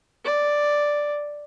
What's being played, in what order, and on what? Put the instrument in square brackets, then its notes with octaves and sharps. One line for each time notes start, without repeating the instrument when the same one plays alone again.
[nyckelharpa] D5